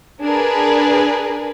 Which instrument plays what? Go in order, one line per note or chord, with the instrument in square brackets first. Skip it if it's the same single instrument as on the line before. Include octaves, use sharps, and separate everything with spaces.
[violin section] D4 G#4 A#4 B4